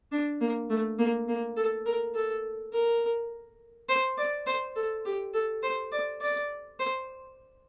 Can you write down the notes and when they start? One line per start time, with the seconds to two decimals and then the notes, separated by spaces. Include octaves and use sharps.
0.12 D4
0.41 A#3
0.70 A3
0.99 A#3
1.28 A#3
1.57 A4
1.86 A#4
2.15 A4
2.73 A#4
3.89 C5
4.18 D5
4.47 C5
4.76 A4
5.05 G4
5.34 A4
5.63 C5
5.92 D5
6.21 D5
6.80 C5